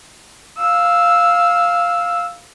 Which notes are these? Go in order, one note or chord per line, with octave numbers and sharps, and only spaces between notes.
F5 E6